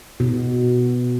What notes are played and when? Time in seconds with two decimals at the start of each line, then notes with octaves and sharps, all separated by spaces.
0.20 B2